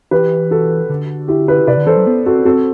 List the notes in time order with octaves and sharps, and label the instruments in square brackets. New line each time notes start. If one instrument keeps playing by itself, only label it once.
[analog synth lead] E3 [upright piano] G4 B4
[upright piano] F#4 A4
[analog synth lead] D3
[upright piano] E4 G4
G4 B4
[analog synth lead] C3 [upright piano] B4 D5
[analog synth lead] D3
[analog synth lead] E3 [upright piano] A4 C5
[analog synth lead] F#3
B3
[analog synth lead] C4 [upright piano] F#4 A4
[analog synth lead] C4 [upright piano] F#4 A4